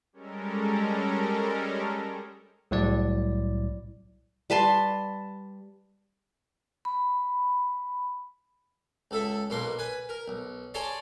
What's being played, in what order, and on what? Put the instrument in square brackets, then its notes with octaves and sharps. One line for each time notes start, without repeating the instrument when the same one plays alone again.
[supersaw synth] G3 G#3 C#4 A4 A#4
[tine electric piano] C2 A2 F#3 E4 D5
[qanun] G3 B4 A5 C6
[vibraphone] B5
[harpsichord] C#2 A4 E5
B1 B2 A#3 C6
B4 G#5
A#4
B1
G#4 C#5 D5 A5 A#5 C6